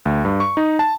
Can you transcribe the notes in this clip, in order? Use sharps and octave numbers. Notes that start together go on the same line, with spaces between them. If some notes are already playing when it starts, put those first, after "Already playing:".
D2
G2
C#6
D#4
A5